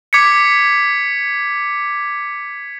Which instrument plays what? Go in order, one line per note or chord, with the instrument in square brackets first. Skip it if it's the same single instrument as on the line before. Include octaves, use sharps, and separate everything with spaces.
[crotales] D6 G#6 B6 C#7